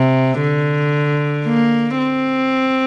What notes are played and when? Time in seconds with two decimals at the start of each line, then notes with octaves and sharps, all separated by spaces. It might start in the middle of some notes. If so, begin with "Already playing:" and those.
Already playing: C3
0.41 D3
1.46 A#3
1.98 C4